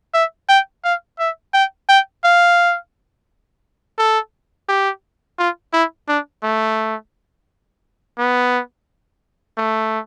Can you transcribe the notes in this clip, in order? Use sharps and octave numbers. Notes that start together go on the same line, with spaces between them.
E5
G5
F5
E5
G5
G5
F5
A4
G4
F4
E4
D4
A3
B3
A3